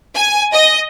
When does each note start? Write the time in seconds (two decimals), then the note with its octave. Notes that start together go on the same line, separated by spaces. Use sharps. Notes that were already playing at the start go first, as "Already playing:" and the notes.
0.14 G#5
0.52 D#5